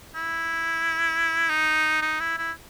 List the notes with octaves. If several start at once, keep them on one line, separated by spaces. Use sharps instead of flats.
E4
D#4
D#4
E4
E4